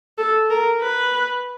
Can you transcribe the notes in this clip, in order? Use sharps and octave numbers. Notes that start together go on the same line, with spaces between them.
A4
A#4
B4